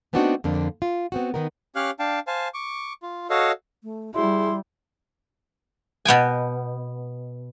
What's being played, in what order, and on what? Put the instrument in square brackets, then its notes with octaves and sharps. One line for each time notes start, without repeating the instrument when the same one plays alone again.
[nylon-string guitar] A3 B3 C4 D4 D#4 F#4
F2 D3 A#3 D4
F4
B3 C4 F#4
D#3 B3 D#4 A#4
[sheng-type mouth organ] C#4 G4 C#5 F5 F6 F#6
D4 F5 G5 A5
C5 F5 G#5 A5
C#6 D6
F4
F#4 A4 C#5 D#5 F5
[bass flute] A3
[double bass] G3 [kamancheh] E4 [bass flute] G#4 [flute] C6
[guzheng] B2 B3 G5 G#5